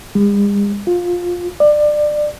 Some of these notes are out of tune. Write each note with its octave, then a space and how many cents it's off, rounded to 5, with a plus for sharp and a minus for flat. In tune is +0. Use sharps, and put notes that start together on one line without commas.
G#3 -45
F4 +15
D5 +25